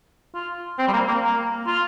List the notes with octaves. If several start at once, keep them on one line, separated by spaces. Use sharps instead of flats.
F4
C4
G3
A#3
A#3
A#3
F4